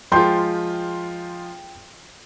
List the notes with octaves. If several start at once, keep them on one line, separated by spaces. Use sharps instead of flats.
F3 G#3 F4 G5 C6 G6